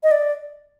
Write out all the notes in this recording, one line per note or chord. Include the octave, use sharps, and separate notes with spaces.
D#5
D5